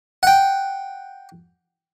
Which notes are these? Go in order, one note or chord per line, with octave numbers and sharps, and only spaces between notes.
F#5 G5